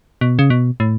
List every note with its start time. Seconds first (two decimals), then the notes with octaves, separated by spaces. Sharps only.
0.21 B2
0.39 C#3
0.50 B2
0.80 A2